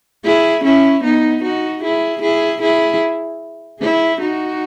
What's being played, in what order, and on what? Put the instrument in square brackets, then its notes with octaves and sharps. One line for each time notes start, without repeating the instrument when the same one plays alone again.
[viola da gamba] E4 G#4
C#4 E4
B3 D#4
D#4 F#4
E4 G#4
E4 G#4
E4 G#4
E4 G#4
D#4 F#4